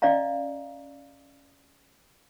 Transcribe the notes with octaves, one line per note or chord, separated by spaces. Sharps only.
C#4 D5 D#5 F5 A#5